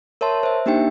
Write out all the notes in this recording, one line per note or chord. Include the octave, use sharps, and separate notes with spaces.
A#4 C#5 E5 A5 C6
C5 E5
A#3 D4 D#4 G4 E5 G5